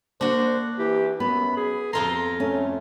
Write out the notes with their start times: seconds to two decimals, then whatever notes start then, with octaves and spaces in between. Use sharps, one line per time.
0.21 A#3 D4 F#4 C5
0.79 E3 G4
1.20 F#2 B3 B5
1.57 G#4
1.93 F2 F4 A4 A#5 C6
2.40 A3 C#4